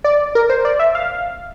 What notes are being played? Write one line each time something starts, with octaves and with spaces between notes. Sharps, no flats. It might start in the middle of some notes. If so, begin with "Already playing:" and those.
D5
A#4
C5
D5
E5
F5